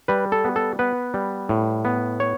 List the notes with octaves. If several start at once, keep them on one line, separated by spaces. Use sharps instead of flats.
G3 B4
A4
B3
A4
B3 B4
G3
A2
B3
C#5